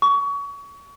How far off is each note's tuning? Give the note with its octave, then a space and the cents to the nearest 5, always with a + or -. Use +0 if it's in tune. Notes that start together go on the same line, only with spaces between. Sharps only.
C#6 +30